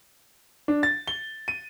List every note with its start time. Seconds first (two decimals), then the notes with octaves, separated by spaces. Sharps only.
0.68 D4
0.83 A6
1.08 G7
1.48 D#7